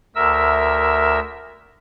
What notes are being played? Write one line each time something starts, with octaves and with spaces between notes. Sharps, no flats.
D2 A#4 E5 E6